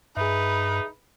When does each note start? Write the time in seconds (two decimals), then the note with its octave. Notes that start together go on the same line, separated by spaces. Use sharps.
0.17 G2 D#4 G#4 B4 E5